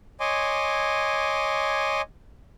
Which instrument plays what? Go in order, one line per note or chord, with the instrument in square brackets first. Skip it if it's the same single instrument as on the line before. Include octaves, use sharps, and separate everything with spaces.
[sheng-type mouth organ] C#5 D#5 G#5 C6 D6